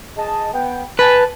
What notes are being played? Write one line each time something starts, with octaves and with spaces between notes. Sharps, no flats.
G#4 D#5 A5
B3 G5
B4 G#5 A5